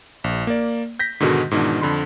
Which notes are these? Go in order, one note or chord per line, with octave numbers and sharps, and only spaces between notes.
A#1
A#3 D5
G6 A#6 B6
G#2 B2 D3 D#3 G#3 F#4
G#2 B2 D#3 E3 D4
F2 D3 B5 C6